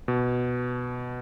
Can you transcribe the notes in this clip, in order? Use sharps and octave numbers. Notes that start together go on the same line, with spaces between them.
B2